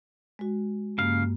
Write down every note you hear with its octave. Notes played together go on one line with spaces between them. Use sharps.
G#3 F#4
G2 C#3 A#3 F5